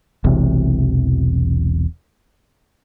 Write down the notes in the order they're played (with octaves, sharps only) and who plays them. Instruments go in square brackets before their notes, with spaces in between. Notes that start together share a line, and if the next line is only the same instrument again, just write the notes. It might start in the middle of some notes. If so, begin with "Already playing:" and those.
[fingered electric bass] E1 B1 E2 C3